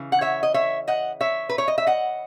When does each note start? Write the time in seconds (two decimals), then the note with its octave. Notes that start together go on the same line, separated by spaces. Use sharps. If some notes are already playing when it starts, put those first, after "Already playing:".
Already playing: C#3 E3
0.12 F#5
0.21 C#5 E5
0.43 D#5
0.54 C#5 E5
0.88 D#5 F#5
1.21 C#5 E5
1.49 B4
1.58 C#5
1.68 D#5
1.78 E5
1.87 D#5 F#5